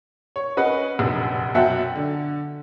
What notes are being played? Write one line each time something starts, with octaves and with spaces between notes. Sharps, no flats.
C#5
C#4 B4 D#5 F#5
F1 A#1 F#2
F#2 B2 E5 F#5 G5 A5
D3